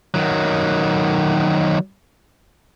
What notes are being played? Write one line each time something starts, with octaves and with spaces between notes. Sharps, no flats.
D#3 F#3